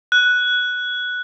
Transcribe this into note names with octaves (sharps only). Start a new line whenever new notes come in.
F#6